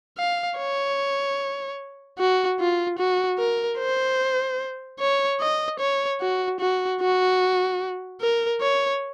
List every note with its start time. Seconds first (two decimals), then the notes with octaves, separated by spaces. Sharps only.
0.18 F5
0.58 C#5
2.19 F#4
2.60 F4
2.99 F#4
3.39 A#4
3.79 C5
5.00 C#5
5.41 D#5
5.80 C#5
6.21 F#4
6.61 F#4
7.01 F#4
8.21 A#4
8.61 C#5